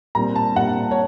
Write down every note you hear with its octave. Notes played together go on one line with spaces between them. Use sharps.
A#2 G3 C4 A#5
A5
A#2 G3 C4 F#5
C#5